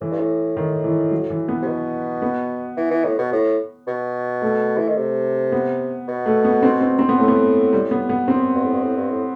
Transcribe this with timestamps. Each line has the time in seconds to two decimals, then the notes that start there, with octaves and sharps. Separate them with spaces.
0.01 A2 E3
0.11 G2
0.19 A2
0.57 D#3
0.84 E3
1.11 F#3
1.30 E3
1.48 B3
1.62 C3
1.67 B2
2.22 B3
2.77 E3
2.91 E3
3.05 A2
3.18 B2
3.32 A2
3.87 B2
4.42 A3
4.77 E3
4.88 D#3
4.97 C3
5.52 B3
6.08 B2
6.26 A3
6.44 B3
6.63 C4
6.81 C4
6.99 C4
7.09 B3
7.18 A2 A3
7.28 B3
7.73 G3
7.91 B3
8.09 B3
8.28 F#2 C4
8.55 G2
8.64 A2
8.73 G2
8.83 A2
8.97 G2
9.10 A2